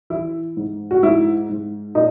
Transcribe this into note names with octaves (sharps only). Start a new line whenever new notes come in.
E3 E4
G#2
F#4
G#2 E4
G#2
A#2 D#4